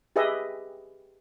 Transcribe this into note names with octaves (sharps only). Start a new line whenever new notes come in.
G4 G#4 B4 D#5 E5